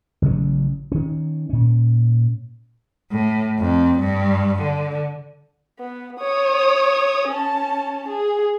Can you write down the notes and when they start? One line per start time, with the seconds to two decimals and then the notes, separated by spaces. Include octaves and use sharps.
0.22 A1 C#3 F#3 C#4
0.92 D#3 C#4
1.50 A#2 C#4
3.11 A2
3.59 F2
3.99 G2
4.62 D3
5.79 B3
6.20 C#5 D#6
7.28 C#4 A5
8.08 G#4